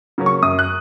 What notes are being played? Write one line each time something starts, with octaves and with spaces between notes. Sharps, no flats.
C#3 F#3 A#3 C#4
C#6
F#2 D#6
F#6